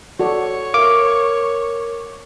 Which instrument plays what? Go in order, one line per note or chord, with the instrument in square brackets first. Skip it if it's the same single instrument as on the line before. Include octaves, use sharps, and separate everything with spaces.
[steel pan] F#4 A4 D5 [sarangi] C#5
[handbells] A#4 [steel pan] E5 F5 [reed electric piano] D6